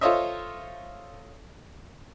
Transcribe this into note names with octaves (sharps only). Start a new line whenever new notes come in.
F4 A4 C5 C#5 D#5 E5